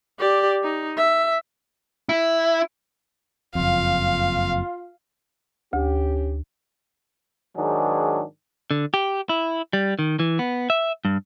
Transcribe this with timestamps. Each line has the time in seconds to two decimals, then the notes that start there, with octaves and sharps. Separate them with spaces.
0.19 G4 D5
0.64 D#4
0.97 E5
2.09 E4
3.55 F#1 F2 F4 F5
5.73 D2 C#4 G4
7.56 G#2 D#3 F#3 D4 G#4
8.71 D3
8.94 G4
9.29 E4
9.73 G3
9.99 D#3
10.20 E3
10.39 B3
10.70 E5
11.05 G2